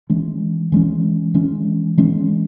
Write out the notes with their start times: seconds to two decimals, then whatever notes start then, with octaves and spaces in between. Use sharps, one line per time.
0.10 E3 G#3 C#4
0.72 E3 G#3 C#4
1.34 E3 G#3 C#4
1.97 E3 G#3 C#4